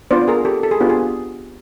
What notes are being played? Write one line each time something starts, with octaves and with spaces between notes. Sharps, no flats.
B3 D4 F4 C5 D5
G#4 A#4
G4 A4
A4
G#4
B3 D4 F4 G4
G#4